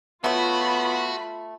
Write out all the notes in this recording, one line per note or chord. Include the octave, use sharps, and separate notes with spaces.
A3 B3 F4 F#4 C#5 B5